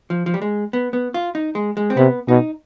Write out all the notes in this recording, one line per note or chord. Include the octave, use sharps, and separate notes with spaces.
F3
F3
G3
G#3
B3
B3
F4
D#4
G#3
G#3
C4
C3 B3
B2 D#4